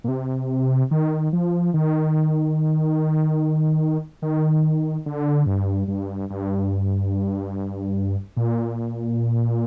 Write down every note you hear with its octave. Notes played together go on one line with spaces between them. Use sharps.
A#2
C3
D#3
F3
D#3
D#3
D3
G2
G2
G2
A#2